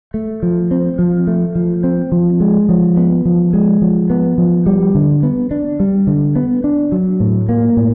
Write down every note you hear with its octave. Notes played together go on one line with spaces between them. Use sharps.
A3
F3
C4
F3
A3
F3
C4
F3
G#3
F3
B3
F3
G#3
F3
B3
F3
G3
D3
B3
D4
G3
D3
B3
D4
F#3
A2
A#3
A2